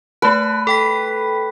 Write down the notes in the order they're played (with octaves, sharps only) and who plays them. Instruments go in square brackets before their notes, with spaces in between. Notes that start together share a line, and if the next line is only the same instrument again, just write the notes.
[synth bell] A3 A5 [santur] B4
[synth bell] A4 G5 B6